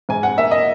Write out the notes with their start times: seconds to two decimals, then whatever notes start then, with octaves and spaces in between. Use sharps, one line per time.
0.09 G#2 G#5
0.23 F#5
0.38 A#3 E5
0.51 D#5